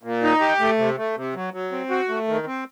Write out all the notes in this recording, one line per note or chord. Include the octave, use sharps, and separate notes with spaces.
A#2
D#4
G4
A3
C3
A3
C3
F#3
F#3
C4
F#4
A3
D#3
C4